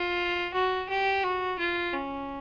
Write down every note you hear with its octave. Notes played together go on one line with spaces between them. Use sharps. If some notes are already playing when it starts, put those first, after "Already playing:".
Already playing: F4
F#4
G4
F#4
F4
C#4